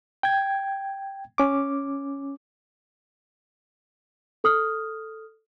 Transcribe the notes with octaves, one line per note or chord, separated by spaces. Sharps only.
G5 G#6
C#4 D6
A4 D#6 F6